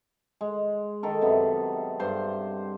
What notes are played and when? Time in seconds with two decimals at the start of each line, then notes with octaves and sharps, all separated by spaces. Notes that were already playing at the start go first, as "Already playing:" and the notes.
0.41 G#3
1.03 D#3 A4 A#4
1.21 F#2 C3 B3
1.99 G2 C5 C6